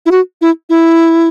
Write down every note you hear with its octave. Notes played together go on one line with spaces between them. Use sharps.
E4
F#4
E4
E4